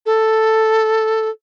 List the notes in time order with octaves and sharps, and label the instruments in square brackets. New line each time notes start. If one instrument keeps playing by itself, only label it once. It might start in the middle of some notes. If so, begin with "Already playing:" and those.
[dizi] A4